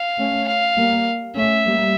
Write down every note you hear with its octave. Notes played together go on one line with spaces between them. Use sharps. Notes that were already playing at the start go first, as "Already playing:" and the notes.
Already playing: F5
A3 C#4
F5
G3 A#3
A3 C#4 E5
G3 A#3